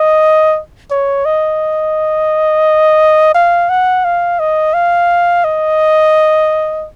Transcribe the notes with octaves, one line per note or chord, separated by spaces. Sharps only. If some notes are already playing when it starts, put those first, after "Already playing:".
Already playing: D#5
C#5
D#5
F5
F#5
F5
D#5
F5
D#5